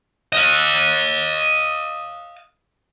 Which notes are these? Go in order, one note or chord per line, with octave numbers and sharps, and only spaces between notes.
D#5 F5